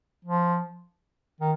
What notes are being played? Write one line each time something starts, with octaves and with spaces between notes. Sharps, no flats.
F3
D#3